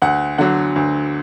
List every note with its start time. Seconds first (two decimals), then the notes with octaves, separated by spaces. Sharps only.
0.02 D2 F#5
0.38 D3 F#3 F#5
0.76 D2